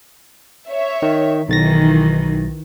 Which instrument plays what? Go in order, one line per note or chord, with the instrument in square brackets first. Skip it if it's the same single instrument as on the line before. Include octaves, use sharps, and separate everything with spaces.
[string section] C#5 E5
[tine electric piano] D#3
[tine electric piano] B1 A6 A#6 [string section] D#3 E3